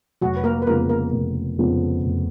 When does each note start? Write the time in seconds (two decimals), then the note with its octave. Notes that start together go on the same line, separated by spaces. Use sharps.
0.21 F1 F#3 F#4
0.37 B4
0.44 A#3 A#4
0.62 B4
0.67 F2 C#3 G#3 A#3 B3 A#4
0.89 A#3 A#4
1.13 F1
1.59 F2 C#3 G#3 B3
2.04 F1